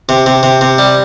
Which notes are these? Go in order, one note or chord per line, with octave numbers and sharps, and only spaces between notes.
C3
C3
C3
C3
G3